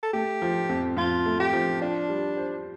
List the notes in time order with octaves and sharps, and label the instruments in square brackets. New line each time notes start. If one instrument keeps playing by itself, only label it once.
[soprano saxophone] A4
[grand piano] A3 [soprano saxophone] G4
[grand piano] F3
F2
[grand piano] F2 [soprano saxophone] F4
[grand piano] A3
[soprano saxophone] G4
[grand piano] F3
[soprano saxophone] D4 [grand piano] F4
[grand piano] G3
C5